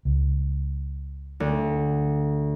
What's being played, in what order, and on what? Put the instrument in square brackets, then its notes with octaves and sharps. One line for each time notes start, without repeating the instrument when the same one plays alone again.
[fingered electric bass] C#2
[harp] D2